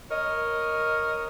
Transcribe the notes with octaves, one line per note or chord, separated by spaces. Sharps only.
A#4 C#5 D#5